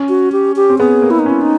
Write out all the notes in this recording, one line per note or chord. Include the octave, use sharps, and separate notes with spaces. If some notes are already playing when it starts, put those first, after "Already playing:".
Already playing: C#4
F#4
G4
G4
C4
B3 G#4
A#3
E4
D#4
C#4 E4
D#4